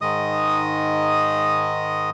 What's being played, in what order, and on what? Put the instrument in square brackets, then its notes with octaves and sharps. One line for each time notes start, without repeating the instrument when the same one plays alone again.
[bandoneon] G#2 D#3 G#3 D#5 D#6